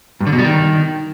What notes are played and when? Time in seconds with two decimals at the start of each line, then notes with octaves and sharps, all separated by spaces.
0.21 G2
0.27 D3
0.33 B2
0.39 G3
0.45 D#3